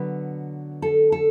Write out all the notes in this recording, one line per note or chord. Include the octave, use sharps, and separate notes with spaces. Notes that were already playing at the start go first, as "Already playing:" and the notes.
Already playing: D3 F#3 B3 B4
A4
A4